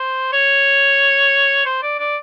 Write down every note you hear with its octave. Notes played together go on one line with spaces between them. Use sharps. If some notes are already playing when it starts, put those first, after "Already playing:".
Already playing: C5
C#5
C5
D5
D5